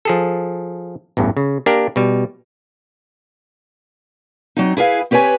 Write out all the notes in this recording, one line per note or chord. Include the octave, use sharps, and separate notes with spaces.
F3 G#4 A4
A1 E2 G2
C#3
A#3 D4 G4 A#4
B2 G3
F#3 C4 D#4
E4 G#4 B4 F5
C4 G4 B4 C#5 G#5